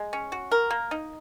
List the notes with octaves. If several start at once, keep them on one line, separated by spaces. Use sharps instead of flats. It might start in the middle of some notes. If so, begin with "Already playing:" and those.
Already playing: G#3
C#4
F#4
A#4
A#3
D#4